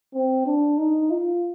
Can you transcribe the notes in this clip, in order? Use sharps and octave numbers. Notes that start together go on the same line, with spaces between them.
C4
D4
D#4
F4